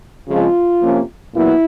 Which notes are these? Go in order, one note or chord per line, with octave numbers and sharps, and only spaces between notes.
C#3 F3 G#3 C4 F4
C3 F3 A#3 C#4
A#2 F#3 B3 E4